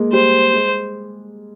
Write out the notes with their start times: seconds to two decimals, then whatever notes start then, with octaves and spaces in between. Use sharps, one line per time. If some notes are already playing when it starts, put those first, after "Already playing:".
Already playing: G#3 A#3
0.13 G3 C5
0.54 G#3